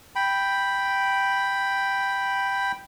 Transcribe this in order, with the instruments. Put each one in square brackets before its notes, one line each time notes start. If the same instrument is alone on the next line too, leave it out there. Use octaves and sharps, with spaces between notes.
[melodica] G5 B5